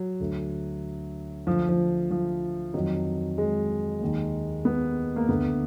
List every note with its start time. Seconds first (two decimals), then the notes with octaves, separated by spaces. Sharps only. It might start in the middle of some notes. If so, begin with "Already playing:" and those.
Already playing: F#3
0.20 D2 D3
1.47 D2 D3 F3
1.69 F3
2.11 F3
2.74 F2 D#3 F#3
3.38 G#3
4.01 D#2 D#3
4.65 B3
5.16 A#3
5.29 D2 D3 B3